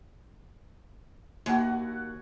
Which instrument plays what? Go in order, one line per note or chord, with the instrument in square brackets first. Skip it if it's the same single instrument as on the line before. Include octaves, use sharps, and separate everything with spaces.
[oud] D#2 [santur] F#4 F#5 G#5